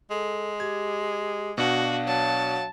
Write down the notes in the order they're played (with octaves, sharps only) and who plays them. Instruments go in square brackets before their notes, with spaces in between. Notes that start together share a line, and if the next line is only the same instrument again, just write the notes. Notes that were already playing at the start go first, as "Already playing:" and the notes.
[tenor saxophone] G#3 [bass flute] A4
[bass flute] G4 [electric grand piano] G#6
[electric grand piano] B2 D4 [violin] F#4 [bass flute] F5
[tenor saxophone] F#3 [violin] A5